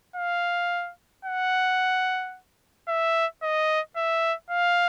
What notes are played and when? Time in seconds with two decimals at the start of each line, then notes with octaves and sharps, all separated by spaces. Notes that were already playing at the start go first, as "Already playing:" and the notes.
0.16 F5
1.25 F#5
2.88 E5
3.43 D#5
3.96 E5
4.50 F5